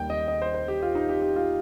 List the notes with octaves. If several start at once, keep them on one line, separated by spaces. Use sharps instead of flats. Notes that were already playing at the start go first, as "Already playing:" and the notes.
Already playing: D#2 D#3 G3 G5
D#5
D#5
C5
C5
G4
F4
D#4
G4
G4
F4